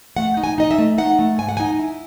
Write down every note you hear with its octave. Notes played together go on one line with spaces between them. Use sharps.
A3 F#5
D#4
G#5
D#4 D#5
E5
A3
D#4 F#5
A3
G#2 G#5
F#5
G#5
D#4
E4